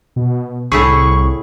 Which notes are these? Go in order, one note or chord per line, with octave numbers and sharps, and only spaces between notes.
B2
C2 A2 E4 G#4 C#6